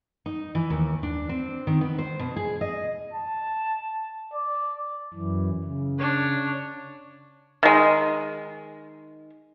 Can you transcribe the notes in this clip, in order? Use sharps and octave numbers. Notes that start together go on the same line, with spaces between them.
D#4
E3
D#2
D4
C4
D#3
B3
C5
B2
G#4
D#5
A5
D5
F#2 E3
C#3
D4 C#5
D#3 G#3